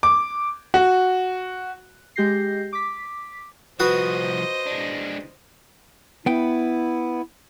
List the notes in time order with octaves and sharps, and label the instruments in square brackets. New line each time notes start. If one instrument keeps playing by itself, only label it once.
[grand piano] D6
F#4
[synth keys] G#3 G4 G6 A#6 C7
D6 B6
[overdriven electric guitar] C2 F3 [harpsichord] F#4 B4 D#6 [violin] C5 D#5
[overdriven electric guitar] G#3 D4
[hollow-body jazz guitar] B3 G5 [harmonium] E4